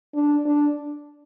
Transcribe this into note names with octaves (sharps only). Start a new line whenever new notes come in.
D4
D4